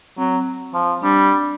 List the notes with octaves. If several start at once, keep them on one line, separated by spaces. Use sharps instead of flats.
F#3 C4
F3
G3 D4